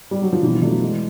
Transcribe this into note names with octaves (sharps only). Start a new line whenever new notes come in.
G3
F#3
F3
B2 E3
F#3 A3 D4 F4
G#3